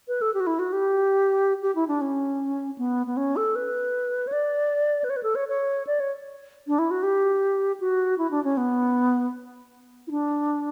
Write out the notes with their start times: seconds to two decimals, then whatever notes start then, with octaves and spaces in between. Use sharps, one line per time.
0.08 B4
0.21 A4
0.34 G4
0.40 F#4
0.47 E4
0.59 F#4
0.73 G4
1.62 G4
1.75 E4
1.88 D4
2.01 C#4
2.78 B3
3.07 B3
3.17 C#4
3.36 A4
3.56 B4
4.27 C#5
4.32 D5
5.04 B4
5.10 C#5
5.16 B4
5.23 A4
5.35 C#5
5.49 C#5
5.87 D5
6.00 C#5
6.67 D4
6.79 E4
6.91 F#4
7.03 G4
7.80 F#4
8.18 E4
8.31 D4
8.44 C#4
8.57 B3
10.07 E4
10.11 D4